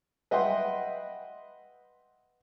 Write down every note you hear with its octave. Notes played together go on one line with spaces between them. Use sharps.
B4 D#5 E5 F#5 G5 C6